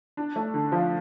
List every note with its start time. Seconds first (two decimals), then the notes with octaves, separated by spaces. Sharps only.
0.17 D4
0.36 A3
0.54 D3
0.72 F3